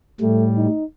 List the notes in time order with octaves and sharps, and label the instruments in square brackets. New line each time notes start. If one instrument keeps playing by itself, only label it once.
[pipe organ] A2 G3 [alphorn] A3
[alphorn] D#4